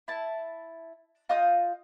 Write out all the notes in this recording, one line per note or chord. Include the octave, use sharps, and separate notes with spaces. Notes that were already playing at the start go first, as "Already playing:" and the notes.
E4 A5
F4 D#5 D#6 G6